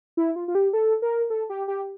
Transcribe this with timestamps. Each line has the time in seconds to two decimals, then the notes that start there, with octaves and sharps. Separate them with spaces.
0.17 E4
0.36 F4
0.48 F4
0.55 G4
0.73 A4
1.02 A#4
1.30 A4
1.50 G4
1.68 G4